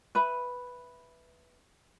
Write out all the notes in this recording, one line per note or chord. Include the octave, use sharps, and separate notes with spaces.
B4 E5 B5